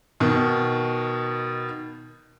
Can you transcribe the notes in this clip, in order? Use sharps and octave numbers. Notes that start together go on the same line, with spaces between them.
B2 D#3